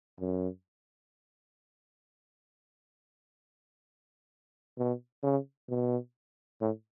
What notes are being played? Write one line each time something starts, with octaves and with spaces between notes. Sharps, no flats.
F#2
B2
C#3
B2
A2